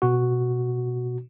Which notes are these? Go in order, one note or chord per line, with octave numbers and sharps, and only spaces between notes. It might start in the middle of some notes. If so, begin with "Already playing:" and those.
B2 F#4